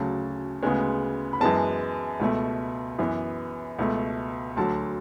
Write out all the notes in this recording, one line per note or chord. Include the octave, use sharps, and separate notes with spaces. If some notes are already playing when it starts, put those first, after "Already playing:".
Already playing: D2 C#3 F#3 A5
D2 C#3 G#3 B3
B5
F#2 E3 G#3 B3 A5
C#2 B2 A3
F#2 E3 B3
C#2 B2 A3
D2 D3 F#3 A5